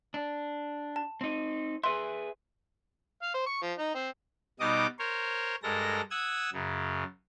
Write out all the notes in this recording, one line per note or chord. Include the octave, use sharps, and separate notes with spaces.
D4
A5
C4 D#4
G#4 B4 E5 C6
F5
C5
C#6
F3
D#4
C4
B2 G3 D#4 D#5 D6 D#6
A#4 C5 C#5
G2 G#3 A4 A#4 A#6
F#5 D#6 E6 G#6
F#2 C#3